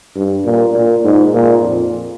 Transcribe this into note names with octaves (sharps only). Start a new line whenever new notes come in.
G2
A#2
A#2
G#2
A#2
F2